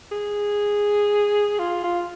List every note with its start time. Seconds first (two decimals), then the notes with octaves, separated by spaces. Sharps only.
0.12 G#4
1.59 F4
1.84 F4